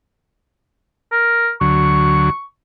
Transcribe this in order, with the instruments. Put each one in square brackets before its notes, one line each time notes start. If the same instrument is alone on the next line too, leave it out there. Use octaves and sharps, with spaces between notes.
[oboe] A#4
[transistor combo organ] D2 F#3 [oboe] C#6